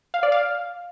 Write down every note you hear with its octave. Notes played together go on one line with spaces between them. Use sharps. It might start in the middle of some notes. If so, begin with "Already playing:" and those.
F5
D5
F5